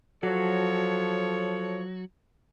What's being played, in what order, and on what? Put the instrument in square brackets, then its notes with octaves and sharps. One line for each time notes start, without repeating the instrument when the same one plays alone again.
[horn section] F3 A4 C#5 [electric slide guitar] F#3 F#4